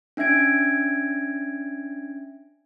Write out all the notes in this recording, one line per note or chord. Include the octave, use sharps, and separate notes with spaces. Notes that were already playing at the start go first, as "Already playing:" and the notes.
C#4 D4 E5 G#6 D7